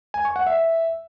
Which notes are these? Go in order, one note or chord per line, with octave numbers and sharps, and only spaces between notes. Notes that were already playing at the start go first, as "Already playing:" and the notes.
G#5
C#6
F#5
E5